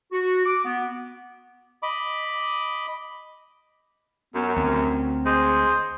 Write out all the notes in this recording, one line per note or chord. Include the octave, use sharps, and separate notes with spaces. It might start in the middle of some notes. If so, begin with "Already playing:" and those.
F#4
D6
B3
D#5 B5 D6
F#2 B3
D2 C4
G#3 C5